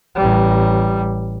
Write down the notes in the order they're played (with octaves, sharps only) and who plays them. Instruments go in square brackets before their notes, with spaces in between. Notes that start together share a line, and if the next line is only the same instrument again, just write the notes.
[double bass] A1 G3